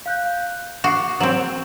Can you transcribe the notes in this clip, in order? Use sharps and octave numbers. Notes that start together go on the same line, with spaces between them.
F5 F#6 G6
F#4 D6 D#6 C7
F#3 C4 D7 E7 F#7